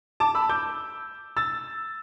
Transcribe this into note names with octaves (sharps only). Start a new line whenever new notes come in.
A5 D6
B5 E6
D6 G6
E6 A6